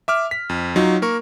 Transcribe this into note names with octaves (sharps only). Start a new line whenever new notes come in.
E5 D6 F6
B6
F2
F#3 D#4 F4
A#3 A#4 C#6